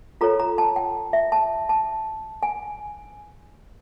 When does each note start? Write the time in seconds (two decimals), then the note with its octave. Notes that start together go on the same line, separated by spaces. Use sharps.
0.21 F4 A4 C#5 A#5
0.40 A#5
0.58 A5
0.76 G5
1.13 E5
1.32 A5
1.69 A5
2.43 G#5